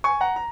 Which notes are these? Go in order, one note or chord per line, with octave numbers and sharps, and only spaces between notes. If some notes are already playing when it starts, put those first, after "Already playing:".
G#5 C#6
F#5 A#5
A#5